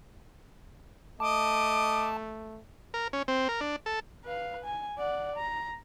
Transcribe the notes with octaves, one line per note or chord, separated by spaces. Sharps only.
A3 D#5 A5 D6
A#4
C#4
C4
A#4
D4
A4
B4 F5
G#5
D5 F#5
A#5